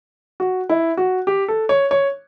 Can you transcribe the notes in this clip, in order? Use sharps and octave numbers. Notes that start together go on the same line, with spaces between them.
F#4
E4
F#4
G4
A4
C#5
C#5